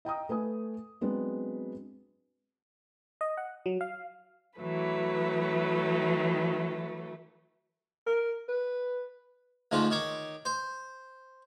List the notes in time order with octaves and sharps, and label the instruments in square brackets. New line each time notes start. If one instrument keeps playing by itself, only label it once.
[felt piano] D#5 G5 A#5 D#6
A3 B4 G#5 D#6
F#3 G#3 B3 C4 D4
[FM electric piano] D#5
F#5
F#3
F5
[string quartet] E3 F#3 A3 B4
[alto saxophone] A#4
B4
[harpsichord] D2 G#2 F3 F4
D#3 C#5 D6
C5